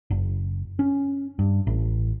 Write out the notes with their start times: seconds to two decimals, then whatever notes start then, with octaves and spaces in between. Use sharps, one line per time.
0.11 F#1
0.79 C#4
1.39 G2
1.67 A1